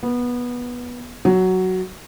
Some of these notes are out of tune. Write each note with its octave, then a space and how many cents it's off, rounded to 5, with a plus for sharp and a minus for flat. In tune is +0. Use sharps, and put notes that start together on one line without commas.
B3 -15
F#3 +5